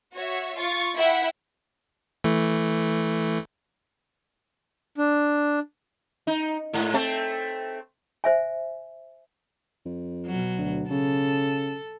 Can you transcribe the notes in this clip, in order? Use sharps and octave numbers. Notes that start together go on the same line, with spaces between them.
F#4 C#5 E5
F4 C#6 A6
E4 E5 F#5 G5
E3 A3
D4
D#4
G#2
A3 C4 A4
C5 E5 G#5
F2
B2 F#3
D2
C#3 A4